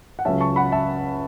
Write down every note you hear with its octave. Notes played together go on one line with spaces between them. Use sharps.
F#5
C#2 C#3 F#3 C#4 E5 A5
A5 C#6
F#5 B5
E5 A5